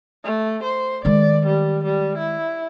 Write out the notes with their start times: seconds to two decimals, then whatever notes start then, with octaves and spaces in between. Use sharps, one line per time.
0.24 A3
0.64 C5
1.05 D#3 G#3 D5
1.46 G3
1.84 G3
2.18 E4